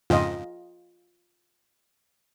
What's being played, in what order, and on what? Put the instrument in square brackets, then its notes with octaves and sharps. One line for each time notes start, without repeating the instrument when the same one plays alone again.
[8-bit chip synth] F2 G#2 C#3 [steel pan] F4 D#5